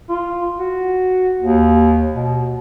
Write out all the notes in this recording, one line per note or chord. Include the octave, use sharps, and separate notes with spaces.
F4
F#4
D#2
B2